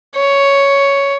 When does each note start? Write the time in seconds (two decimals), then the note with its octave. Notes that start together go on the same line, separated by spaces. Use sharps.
0.16 C#5